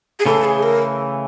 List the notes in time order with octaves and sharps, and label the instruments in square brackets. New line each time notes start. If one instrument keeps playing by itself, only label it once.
[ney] G#4
[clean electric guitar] C#3 E3 A3 [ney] A4
[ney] G#4
A#4